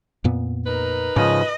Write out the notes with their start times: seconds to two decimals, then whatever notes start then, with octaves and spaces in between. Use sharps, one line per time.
0.24 F2 A#2 B3
0.67 D#4 A#4 B4
1.16 G#2 C#3 F3 D#5